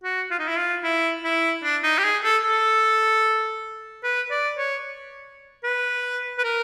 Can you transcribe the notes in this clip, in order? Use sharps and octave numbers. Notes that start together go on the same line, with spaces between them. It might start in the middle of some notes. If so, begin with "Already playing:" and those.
F#4
F4
D#4
E4
F4
E4
E4
D4
D#4
G4
G#4
A4
A4
B4
D5
C#5
B4
B4
A#4